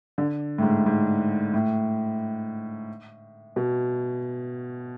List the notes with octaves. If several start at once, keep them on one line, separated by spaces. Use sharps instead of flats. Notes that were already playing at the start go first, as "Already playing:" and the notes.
D3
A2
G#2
G#2
A2
B2